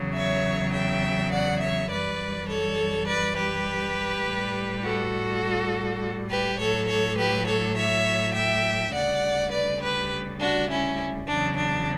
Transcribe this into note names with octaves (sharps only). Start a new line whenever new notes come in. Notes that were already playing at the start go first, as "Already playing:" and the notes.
Already playing: E2 C#3 F#3
C#5 E5
E5 G5
D5 F#5
C#5 E5
F#2 E3 G3 B4 D5
A4 C#5
B4 D5
G4 B4
A2 G3
F#4 A4
G4 B4
A2 F#3 A4 C#5
A4 C#5
G4 B4
A4 C#5
C#5 E5
E5 G5
D2 C#3 G3 D5 F#5
B4 D5
G4 B4
D4 F#4
C#4 E4
E2 C#3 F#3 D4
D4